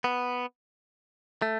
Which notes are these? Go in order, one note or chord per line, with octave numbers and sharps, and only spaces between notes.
B3
A3